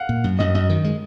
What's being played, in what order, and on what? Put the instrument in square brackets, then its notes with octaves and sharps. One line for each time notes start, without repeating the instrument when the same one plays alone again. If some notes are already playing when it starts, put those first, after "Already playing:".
Already playing: [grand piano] F5 F#5
[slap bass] A#2
F#2
[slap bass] F#2 [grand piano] D#5
[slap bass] F#2 [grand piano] D#5
[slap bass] D#3
G#3